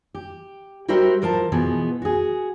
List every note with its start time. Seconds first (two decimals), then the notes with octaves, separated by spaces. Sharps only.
0.14 G4
0.88 G3 F#4 G4 A#4 C5 E5
1.22 A2 F3 A#4 C5 A5
1.52 B2 E3 F3 B3 G#4
2.02 F#4 G#4